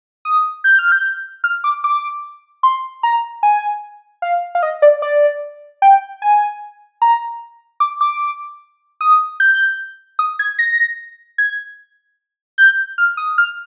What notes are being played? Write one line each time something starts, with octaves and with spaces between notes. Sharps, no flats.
D#6
G6
F6
G6
F6
D6
D6
C6
A#5
G#5
F5
F5
D#5
D5
D5
G5
G#5
A#5
D6
D6
D#6
G6
D#6
G#6
A#6
G#6
G6
F6
D#6
F6